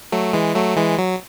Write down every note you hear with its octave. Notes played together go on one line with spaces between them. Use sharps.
F#3 A3
E3 G#3
F#3 A3
E3 G#3
F#3